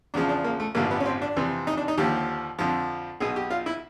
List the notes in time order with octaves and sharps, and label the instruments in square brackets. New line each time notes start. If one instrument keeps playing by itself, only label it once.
[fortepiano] E2 C#3 F3 D4
D4
A#3
A3
A1 G2 D3 F3 A#3
B3
C#4
C4
D4
F2 C3 E3
D#4
D4
D#4
D#2 D3 F3 G4
F2 D3 F3
B1 B2 G#4
G4
F4
E4